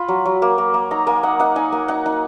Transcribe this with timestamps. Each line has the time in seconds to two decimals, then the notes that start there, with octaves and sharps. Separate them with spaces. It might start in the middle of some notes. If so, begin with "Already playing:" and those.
Already playing: F4 B5
0.08 F#3
0.25 F#3
0.42 A#3
0.58 A#3
0.74 A#3
0.91 D#4 A#5
1.07 A#3 G#5
1.23 D#4 F#5
1.40 D#4 F#5
1.56 D#4 G#5
1.72 A#3
1.88 D#4 F#5
2.06 D#4